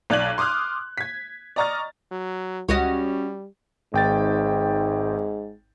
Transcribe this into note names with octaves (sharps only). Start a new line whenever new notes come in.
B1 D5 F#6 G#6 F#7
C6 D6 D#6 F6 F#6
G#6 B6
D5 D#5 A#5 C#6 F6 A6
F#3
C#2 G3 C#4 F#4 D#5
G#1 G#2 G5 A6